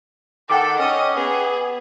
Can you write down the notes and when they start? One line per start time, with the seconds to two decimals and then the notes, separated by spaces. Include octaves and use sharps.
0.50 D#3 A4 F#5 G5 D6
0.79 C#4 D#5
1.16 B3 G#4